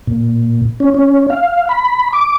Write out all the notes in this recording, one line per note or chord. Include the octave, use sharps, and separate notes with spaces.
A#2
C#4
C#4
F5
B5
D6